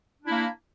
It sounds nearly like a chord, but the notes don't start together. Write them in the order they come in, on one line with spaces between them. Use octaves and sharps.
D4 E4 A#3